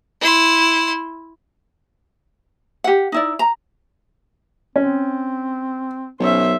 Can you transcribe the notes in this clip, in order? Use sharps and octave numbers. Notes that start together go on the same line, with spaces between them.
E4 C6
G4 F#5
D#4 E4 D5
A#5
C4 C#4
B1 C#4 C5 E5